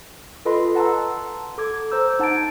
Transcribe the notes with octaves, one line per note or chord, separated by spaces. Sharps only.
F4 A4 B4 D#5 B5 C6
F#5 A5 A#5 C6 E6
A4 D6 G#6
C5 A#5 D6 E6 G6
D#4 F#5 A5 G#6 A6 D7